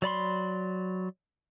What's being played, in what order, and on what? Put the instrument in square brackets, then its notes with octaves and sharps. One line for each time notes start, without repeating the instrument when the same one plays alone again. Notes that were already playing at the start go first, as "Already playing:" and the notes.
[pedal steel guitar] F#3 D5 B5 C6